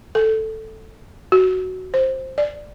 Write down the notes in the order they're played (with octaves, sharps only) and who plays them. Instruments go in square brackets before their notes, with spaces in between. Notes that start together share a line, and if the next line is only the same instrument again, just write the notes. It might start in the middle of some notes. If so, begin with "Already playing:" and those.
[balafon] A4
F#4
C5
D5